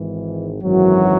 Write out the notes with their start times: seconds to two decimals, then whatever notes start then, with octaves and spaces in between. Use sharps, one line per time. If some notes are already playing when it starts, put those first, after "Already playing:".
Already playing: G#1 G#2 E3
0.60 G#1 F#2 E3 F#3 F#4